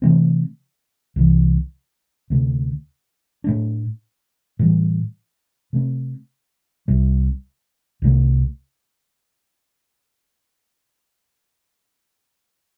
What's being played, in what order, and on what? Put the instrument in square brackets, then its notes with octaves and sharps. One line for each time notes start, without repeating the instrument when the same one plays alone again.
[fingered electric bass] C3 E3 A3 C4
C2 C3 E3
D2 C3 A3
A2 A3 D4
A2 E3 G3
C3 A3 C4
C2 C3 G3
C2 C3 A3